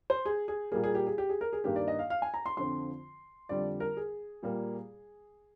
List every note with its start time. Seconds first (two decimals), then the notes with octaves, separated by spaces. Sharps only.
0.10 C5
0.25 G#4
0.48 G#4
0.72 A#2 G3 A#3 G#4
0.84 G#4
0.95 G4
1.07 G#4
1.18 G4
1.29 G#4
1.41 A#4
1.53 G#4
1.64 G2 D#3 A#3 G4
1.76 D5
1.88 D#5
1.99 F5
2.10 F5
2.22 G#5
2.34 A#5
2.46 C6
2.57 F2 D3 F3 C4 C6
3.49 F2 D3 G3 D5
3.80 A#4
3.97 G#4
4.43 A#2 G3 A#3